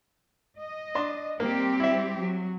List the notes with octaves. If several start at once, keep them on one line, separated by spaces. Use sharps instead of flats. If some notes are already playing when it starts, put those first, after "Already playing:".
D#5
D4 C6
G3 A#3 C4 G4
E4 E5
F#3